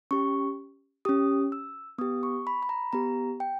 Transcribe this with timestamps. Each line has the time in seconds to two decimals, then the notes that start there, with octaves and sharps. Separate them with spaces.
0.11 C#4 G4 C#6
1.05 C#4 G4 D#6
1.52 E6
1.98 B3 D#6
2.01 G4
2.23 C#6
2.47 B5
2.62 B5
2.69 A#5
2.93 B3 G4 A#5
3.40 G5